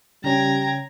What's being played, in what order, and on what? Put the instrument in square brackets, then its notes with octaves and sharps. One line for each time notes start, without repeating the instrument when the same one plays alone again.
[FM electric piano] C#3 C#4 [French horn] G3 [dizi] G5 [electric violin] A#5 G#6